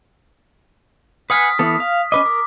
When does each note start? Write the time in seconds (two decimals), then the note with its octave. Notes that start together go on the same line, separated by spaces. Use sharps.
1.30 B4 F#5 G#5 D#6 F6 B6
1.59 E3 B3 A4
1.80 F5
2.12 C#4 B4 D#5 D6
2.26 A#4